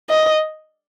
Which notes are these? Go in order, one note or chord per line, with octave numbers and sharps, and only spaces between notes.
D#5